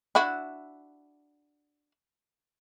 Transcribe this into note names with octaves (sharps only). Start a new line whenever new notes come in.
D4 E4 F#4